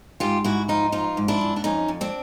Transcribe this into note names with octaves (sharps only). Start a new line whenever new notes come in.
G#2 F4 G4
G#2 E4 F#4
F3 D#4 F4
F3 D#4 F4
G#2
D4 E4
G#2
D4
F2 C#4 D#4
F2
C4 D4